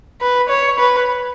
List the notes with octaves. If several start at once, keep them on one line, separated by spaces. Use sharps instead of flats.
B4
C#5
B4